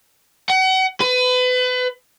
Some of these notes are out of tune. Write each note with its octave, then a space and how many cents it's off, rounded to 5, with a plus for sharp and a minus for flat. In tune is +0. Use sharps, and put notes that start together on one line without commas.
F#5 +35
B4 +30